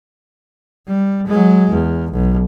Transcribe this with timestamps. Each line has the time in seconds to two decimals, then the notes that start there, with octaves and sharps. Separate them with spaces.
0.87 G3
1.27 F#3 G#3
1.70 E2
2.12 B1